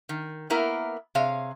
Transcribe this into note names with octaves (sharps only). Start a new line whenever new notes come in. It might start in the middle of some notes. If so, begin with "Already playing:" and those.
D#3
A#3 B3 E4 A#4
C3 G#4 C#5 F5